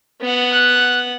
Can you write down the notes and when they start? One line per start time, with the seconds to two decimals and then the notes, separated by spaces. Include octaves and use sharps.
0.22 B3 F#5
0.52 F#6